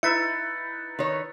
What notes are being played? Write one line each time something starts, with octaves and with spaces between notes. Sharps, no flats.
D#4 E4 B4 E5 A6 C#7
D#3 C#5